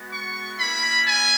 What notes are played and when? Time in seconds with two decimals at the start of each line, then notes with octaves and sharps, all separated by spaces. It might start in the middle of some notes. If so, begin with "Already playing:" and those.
Already playing: G#3 B3 F#4
0.11 C#6
0.58 A#3 C#4 E4 B5
1.04 G#5